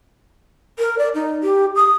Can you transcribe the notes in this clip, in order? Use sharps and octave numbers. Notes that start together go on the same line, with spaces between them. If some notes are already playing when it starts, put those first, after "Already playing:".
A#4
D5
D#4
G4
D#6